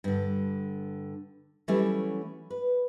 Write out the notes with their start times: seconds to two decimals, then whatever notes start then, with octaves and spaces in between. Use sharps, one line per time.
0.04 G2 D3
1.68 E3 F#3 G3 A3 C#4 E4
2.50 B4